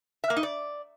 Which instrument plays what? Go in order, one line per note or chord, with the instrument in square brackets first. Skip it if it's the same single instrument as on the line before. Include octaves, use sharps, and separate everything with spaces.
[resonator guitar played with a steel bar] E5
A#3
D#4
D5